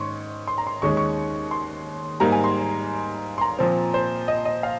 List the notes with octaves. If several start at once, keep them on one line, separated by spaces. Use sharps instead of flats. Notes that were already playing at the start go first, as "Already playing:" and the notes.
Already playing: G#2 D#3 C#4 C6 C#6
C6
A#5
C6
D#2 D#3 G#3 C#4 C#6
C#6
C6
G#2 G3 A#3 A#5
G#5
C6
C6
A#5
A#2 F3 C4
C5
D#5
D#5
F5